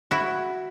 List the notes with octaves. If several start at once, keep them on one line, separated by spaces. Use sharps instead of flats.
E4 F#4